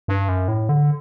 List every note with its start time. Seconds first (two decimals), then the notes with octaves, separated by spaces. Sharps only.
0.08 G2
0.29 F#2
0.48 A2
0.69 D3